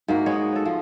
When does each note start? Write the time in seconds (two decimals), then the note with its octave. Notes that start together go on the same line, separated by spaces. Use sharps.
0.08 G#2 A#3 F#4
0.26 G#3 B3 C#5 D#5
0.52 A4 C#5
0.66 F3